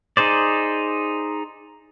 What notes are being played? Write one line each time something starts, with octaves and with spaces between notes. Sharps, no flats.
D#4 G#4 C5 D5